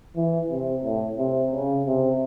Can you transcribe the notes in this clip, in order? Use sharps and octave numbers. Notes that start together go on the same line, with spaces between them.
E3
C3
A2
C3
C#3
C3